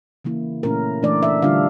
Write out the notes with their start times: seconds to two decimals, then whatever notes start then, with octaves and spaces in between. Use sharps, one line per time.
0.25 C#3 E3 A#3 E4
0.63 A#2 A3 C#4 E4 A#4
1.03 E3 A3 D4 D5
1.23 E5
1.42 D3 G3 D4 F4 F5